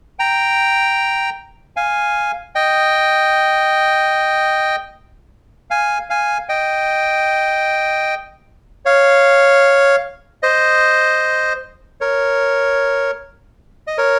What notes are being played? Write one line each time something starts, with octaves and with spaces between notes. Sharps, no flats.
G5 A#5
F5 G#5
D#5 G5
F5 G#5
F5 G#5
D#5 G5
C#5 F5
C5 D#5
A#4 C#5
D#5
A#4 C#5